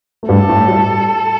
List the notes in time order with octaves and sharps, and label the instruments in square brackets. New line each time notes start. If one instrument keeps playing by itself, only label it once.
[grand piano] A3
[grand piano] G2 G3 [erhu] A4
[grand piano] A2 A3
G3